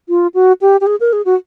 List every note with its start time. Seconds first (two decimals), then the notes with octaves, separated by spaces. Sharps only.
0.09 F4
0.34 F#4
0.61 G4
0.81 G4
0.87 G#4
1.00 A#4
1.13 G#4
1.25 F#4